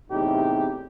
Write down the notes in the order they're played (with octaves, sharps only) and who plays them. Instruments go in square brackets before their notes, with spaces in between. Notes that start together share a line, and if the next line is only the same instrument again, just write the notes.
[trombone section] E2 A2 C3 C4 D#4 G4